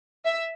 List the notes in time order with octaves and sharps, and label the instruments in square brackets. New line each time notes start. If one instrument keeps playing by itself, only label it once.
[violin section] E5